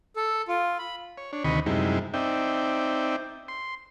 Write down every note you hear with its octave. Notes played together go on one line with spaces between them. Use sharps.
A4
F4
B5
C#5
D4 C#5
D2 C3 D#3 D#5 B5 C#6
F#2 C3 G3 G#3 D#4 E4
C4 D#4 D5 E5 G5
C6